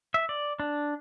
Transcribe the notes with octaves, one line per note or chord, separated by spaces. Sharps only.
E5
D5
D4